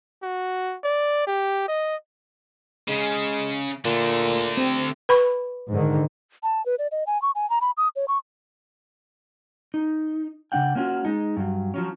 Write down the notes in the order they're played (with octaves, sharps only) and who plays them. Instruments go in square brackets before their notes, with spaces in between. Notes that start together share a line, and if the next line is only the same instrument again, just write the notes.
[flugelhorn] F#4
D5
G4
D#5
[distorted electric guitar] C#3 [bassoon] G#3
[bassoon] A#2 [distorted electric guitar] D3 A3
[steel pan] C4
[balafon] B4 B5 C#6
[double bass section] G#2 D3 D#3
[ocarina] A5
B4
D5
D#5
G#5
C#6
G#5
A#5
B5
D#6
C#5
C#6
[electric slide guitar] D#4
C#3 E3 D4 F#5 G5
A#3 C#4 F4 F#4
G#3 D#4
G2 F#3
F3 F#3 C#4